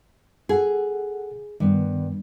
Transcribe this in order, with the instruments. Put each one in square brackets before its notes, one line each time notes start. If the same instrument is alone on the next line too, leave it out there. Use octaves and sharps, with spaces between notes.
[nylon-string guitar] G#4 [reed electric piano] A4 F#5
[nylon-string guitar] G2 [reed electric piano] D#3 B3